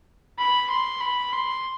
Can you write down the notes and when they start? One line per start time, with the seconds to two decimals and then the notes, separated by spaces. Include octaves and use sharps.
0.38 B5
0.70 C6
1.00 B5
1.33 C6